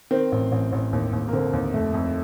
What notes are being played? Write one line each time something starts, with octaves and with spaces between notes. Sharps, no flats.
D#3 C4
A1
A1
A1
D#2
D#2
A#3
D3 C4
D#2
F2 A3
F2